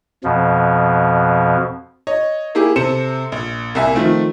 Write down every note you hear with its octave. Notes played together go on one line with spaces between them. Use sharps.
F2 B2 F3
C#5 D#5
A#3 E4 G4 G#4
C3 A4 C5 C#7 E7
A#1
C2 A#3 E5 G#5
D#3 F3 A3 C4